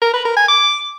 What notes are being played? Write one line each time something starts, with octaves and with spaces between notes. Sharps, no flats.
A#4
B4
A#4
G#5
D6